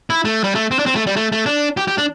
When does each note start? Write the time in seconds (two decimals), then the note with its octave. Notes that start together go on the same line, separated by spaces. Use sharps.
0.10 E4
0.25 A3
0.44 G3
0.55 A3
0.71 C4
0.79 D4
0.86 C4
0.95 A3
1.07 G3
1.16 A3
1.32 A3
1.46 D4
1.77 G4
1.88 G4
1.98 D4